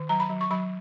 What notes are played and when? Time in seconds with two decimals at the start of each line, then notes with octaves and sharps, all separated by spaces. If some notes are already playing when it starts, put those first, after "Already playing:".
Already playing: D#3
0.09 F#3 A#5
0.20 B5
0.30 F#3
0.41 C#6
0.51 F#3 B5